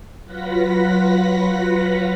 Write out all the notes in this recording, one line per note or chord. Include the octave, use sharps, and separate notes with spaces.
F#3 F4 B4 F#5 A#6 B6